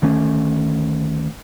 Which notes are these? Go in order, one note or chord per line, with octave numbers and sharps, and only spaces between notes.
D2 D#3 A3 C#4